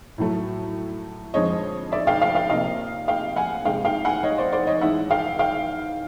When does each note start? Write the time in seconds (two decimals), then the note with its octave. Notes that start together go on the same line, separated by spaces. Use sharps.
0.18 A2 F#3 A3
1.34 F2 D3 F3 G#3 C#5 D#5
1.92 D5 E5
2.07 F5 G5
2.21 F5 G5
2.35 F5 G5
2.50 C3 F3 A#3 D#5 F5
3.08 F5 G5
3.36 F#5 G#5
3.65 C3 D#3 G#3 F5 G5
3.85 F5 G5
4.05 F#5 G#5
4.23 C#5 D#5
4.38 C5 D5
4.53 C5 D5
4.67 C#5 D#5
4.81 G#2 E3 G#3 E5 F#5
5.10 F5 G5
5.39 F5 G5